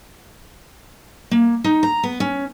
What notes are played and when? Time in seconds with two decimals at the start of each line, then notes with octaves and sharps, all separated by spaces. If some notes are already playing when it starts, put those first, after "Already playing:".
1.31 A#3
1.64 D#4
1.83 A#5
2.03 B3
2.20 C#4